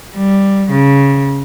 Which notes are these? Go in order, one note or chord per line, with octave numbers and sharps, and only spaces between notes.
G3
C#3